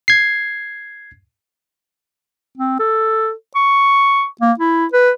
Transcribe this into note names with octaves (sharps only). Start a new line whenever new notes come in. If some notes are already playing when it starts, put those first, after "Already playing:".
G#6 C7
C4
A4
C#6
A#3
E4
B4